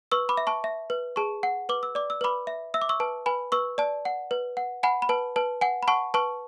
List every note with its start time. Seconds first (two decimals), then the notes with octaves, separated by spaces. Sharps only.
0.12 B4 C#6 E6
0.29 B5 D6
0.37 E5
0.47 A5 C#6
0.64 E5
0.90 B4
1.16 G#4 A5 C#6
1.43 F#5
1.69 B4 D6
1.83 E6
1.95 D5 D6
2.10 E6
2.21 B4 B5 D6
2.47 E5
2.74 E5 E6
2.82 D6
2.89 C#6 E6
3.00 B4 A5
3.26 B4 G#5 B5
3.52 B4 C#6 E6
3.78 D5 A5
4.05 F#5
4.31 B4
4.57 F#5
4.83 F#5 G#5 B5
5.02 B5
5.09 B4 A5
5.36 B4 A5
5.61 F#5 G#5
5.83 B5
5.88 F#5 A5 C#6
6.14 B4 A5 C#6